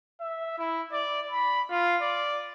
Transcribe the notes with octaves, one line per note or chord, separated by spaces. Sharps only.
E5
E4
D5
B5
F4
D5